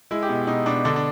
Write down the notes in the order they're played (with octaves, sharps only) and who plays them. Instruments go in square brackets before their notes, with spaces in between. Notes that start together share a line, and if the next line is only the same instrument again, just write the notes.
[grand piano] G#3 E4
G4
B2
B2 D#4
B2 D4
D3 D4
D4